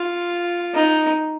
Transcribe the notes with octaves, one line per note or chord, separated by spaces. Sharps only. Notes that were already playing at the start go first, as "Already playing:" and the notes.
Already playing: F4
D#4